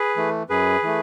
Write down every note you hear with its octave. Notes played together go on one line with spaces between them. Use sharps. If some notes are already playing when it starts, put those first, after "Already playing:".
Already playing: G#4 B4
E3 A3
F#2 G#4 B4
E3 A3